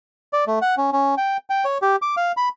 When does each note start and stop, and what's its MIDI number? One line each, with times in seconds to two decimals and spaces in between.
0.33 0.44 74
0.47 0.59 57
0.62 0.75 78
0.78 0.90 61
0.93 1.15 61
1.18 1.37 79
1.50 1.65 79
1.65 1.78 73
1.82 1.96 67
2.02 2.15 86
2.17 2.32 77
2.37 2.49 83